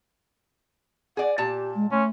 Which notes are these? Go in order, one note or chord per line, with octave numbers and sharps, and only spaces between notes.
G#4 D5 F#5
A#2 G4 A5
G#3
A3 C#4 C6